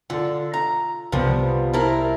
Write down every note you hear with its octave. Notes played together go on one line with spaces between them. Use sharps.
D3 F4 A4
A#5
C2 C3 F3 G3 B3
C4 E4 A#4 A5 F6